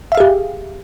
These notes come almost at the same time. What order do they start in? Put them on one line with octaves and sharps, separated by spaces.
E5 F5 G#4 G4